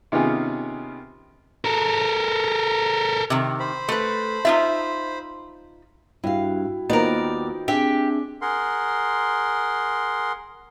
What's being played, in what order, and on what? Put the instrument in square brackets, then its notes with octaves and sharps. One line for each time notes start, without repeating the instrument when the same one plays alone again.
[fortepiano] C3 D#3 B3 C#4 F4 G#4
[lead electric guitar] A4 A#4
[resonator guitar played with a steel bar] C3 D#3
[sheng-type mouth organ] C5 B5
[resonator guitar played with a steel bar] A3 B4
D#4 F4 E5
[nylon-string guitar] G2 F5 [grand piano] E4 [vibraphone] F#4 G5
[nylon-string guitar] D#2 B3 [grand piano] D#4 F4 C5 [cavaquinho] A#4 D5
[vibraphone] C4 G#4 G#5 [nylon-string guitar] D4 E5 [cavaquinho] G4
[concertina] G#4 A#4 F#5 C6